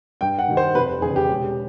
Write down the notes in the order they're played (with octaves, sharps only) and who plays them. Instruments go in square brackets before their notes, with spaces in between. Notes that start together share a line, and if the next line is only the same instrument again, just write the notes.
[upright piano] G2 G5
F#5
D#3 G3
C5
F1 B4
E2 C#3 G#4
G4
E1